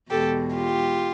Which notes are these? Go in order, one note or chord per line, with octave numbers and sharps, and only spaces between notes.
E2 B2 G#3 G4 A4
F4 G4